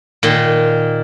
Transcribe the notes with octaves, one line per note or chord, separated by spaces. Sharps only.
A#2 D#3 C6